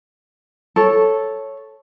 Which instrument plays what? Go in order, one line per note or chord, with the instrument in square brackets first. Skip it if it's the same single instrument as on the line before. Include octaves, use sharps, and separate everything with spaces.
[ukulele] A4 C#5